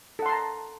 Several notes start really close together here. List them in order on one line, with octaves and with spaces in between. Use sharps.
A4 F#5 C6 A5 A#5